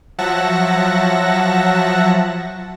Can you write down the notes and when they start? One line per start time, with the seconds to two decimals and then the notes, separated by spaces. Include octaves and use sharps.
0.18 F3 F#3 E5 F#5 A5 A#6